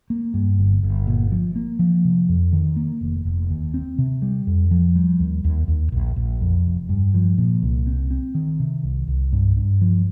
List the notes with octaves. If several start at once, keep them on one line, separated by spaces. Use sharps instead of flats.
A#3
G2
G1
G1
A#2
F3
A#3
F3
C3
F2
D#3
A#3
F1
F1
D#2
C4
C3
G3
F2
F3
G3
D#2
D#2
D#2
A#1
A#1
F2
F1
G2
F3
A#2
C2
C4
C4
D#3
C3
C2
C2
G2
G2
F3